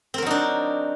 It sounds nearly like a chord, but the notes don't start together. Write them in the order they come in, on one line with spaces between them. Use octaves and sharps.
C4 A#4 F#3 D#4 D4